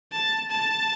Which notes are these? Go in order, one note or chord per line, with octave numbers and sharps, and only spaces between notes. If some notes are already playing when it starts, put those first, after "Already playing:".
A5
A5